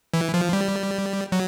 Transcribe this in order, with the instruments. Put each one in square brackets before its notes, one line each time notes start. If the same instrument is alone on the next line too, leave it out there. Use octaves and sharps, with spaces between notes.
[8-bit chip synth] E3
F3
G3
F#3